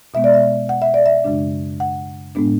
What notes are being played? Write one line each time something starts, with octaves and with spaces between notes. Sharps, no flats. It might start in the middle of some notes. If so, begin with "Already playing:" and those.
B2 G#3 B3 E5
D5
E5
F#5
E5
D5
E5
F#2 C#3 G#3 D4
F#5
A2 G#3 B3 D4